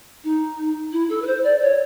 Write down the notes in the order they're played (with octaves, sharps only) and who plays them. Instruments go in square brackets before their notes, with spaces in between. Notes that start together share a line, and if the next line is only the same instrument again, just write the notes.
[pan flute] D#4
E4
A4
B4
C5
D5
C#5